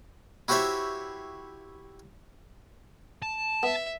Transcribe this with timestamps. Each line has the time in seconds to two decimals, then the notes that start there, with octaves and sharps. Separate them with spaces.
0.48 E4 F#4 G4 C5 C#5 E5
3.22 A5
3.63 B3 E5